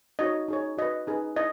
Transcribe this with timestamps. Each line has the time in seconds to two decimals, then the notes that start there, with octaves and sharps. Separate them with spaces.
0.19 D#4 F#4 C#5 D#5
0.48 D#4 G#4 C#5
0.77 F#4 B4 D#5
1.07 D#4 G#4 B4
1.36 E4 D#5